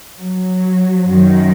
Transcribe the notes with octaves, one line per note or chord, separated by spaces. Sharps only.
F#3
F#2 D#3